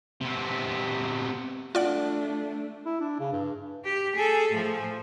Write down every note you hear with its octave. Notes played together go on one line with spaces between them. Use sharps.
C3 B3
A3 D4 F4 D5 F#5
E4
D4
C#3
G2
G4
G#4 A4
A2 F3